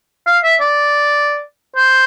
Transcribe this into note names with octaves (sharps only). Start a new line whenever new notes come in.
F5
E5
D5
C5